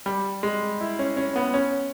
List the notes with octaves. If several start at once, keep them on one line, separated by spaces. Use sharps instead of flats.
G3
G#3
E4
C#4
C#4
B3
C#4